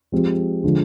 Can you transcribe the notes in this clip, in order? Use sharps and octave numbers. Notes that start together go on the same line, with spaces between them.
F3 G#3 C4 G4
D3 F3 G#3